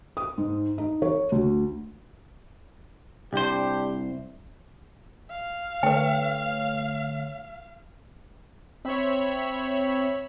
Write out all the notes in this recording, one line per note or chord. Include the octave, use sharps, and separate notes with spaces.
D#6
G#2
D#4
C#5
D2
C2 D4 G4 C5
F5
D3 A3 B4 C#5 G5
C4 C#5 E5 B5